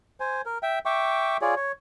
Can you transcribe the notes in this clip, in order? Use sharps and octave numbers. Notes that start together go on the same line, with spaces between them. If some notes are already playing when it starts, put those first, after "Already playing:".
C5 G#5
A#4
E5 G5
E5 G5 C#6 D6
F4 G#4 C#5 D5
C#5